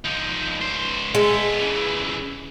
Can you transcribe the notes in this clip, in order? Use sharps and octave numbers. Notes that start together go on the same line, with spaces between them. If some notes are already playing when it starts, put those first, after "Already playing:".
F3 D#4
C#2 C5
G#3 B3 A4
C#3 E3